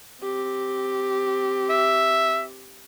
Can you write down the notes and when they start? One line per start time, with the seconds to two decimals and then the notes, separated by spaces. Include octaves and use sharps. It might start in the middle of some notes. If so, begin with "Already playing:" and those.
0.23 C4 G4
1.70 E5